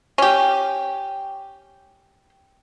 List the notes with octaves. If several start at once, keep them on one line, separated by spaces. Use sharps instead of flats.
C#4 G4